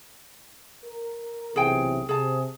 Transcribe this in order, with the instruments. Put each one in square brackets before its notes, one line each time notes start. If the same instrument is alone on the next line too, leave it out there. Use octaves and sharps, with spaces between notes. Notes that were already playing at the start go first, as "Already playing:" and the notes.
[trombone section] A#4
[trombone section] B1 C3 E3 [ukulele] G#4 G5
[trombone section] C3 [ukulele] G#4 A5